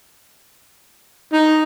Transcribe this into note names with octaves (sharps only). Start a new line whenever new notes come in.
D#4